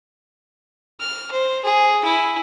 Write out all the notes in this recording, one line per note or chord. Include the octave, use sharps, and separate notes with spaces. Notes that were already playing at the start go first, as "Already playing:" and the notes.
F6
C5
G#4
E4 G#5